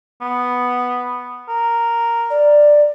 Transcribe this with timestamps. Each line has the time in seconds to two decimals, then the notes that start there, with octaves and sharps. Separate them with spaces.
0.21 B3
1.49 A#4
2.30 D5